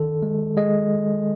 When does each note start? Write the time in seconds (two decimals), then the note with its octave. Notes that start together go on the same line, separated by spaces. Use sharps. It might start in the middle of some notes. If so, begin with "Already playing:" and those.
Already playing: D#3 A4
0.23 G#3
0.57 G#3 D#5